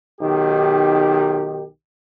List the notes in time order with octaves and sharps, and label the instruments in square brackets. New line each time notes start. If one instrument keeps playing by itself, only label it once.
[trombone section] B1 D#3 G4